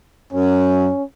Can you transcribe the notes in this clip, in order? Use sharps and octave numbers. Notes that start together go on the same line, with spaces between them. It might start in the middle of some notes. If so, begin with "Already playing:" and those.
F#2 C#4